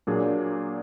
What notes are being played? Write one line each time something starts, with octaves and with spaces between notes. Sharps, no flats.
A#2 F#3 A#3 D4 G#4